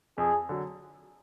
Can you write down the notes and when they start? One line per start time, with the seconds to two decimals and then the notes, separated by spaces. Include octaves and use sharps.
0.18 F2 G#4
0.49 D3 F#3